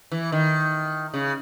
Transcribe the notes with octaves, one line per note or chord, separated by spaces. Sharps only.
E3
D#3
C#3